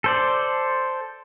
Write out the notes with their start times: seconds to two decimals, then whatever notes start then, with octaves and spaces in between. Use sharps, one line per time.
0.04 A4 C5 D5